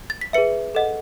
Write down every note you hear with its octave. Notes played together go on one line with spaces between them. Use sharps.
A6
B6
G#4 B4 E5 C#7
A4 D#5 F#5